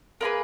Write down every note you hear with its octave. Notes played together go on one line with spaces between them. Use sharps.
A#3 E4 G#4 B4